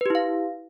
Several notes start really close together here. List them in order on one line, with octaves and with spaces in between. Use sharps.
B4 G4 E4 F5